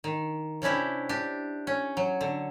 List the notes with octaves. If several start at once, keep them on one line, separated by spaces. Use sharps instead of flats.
D#3
C3 C#4 D4 E4 G4
D4 G4
C#4
F#3
D3